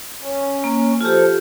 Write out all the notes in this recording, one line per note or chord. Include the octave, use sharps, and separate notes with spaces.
C#4
A#3
F3 F4 G4 A4